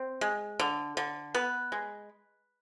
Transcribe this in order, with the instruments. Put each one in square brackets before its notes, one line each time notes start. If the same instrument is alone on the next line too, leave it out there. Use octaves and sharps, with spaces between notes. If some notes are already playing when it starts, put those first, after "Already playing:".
Already playing: [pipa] C4
G#3
D3
D3
B3 B4
G#3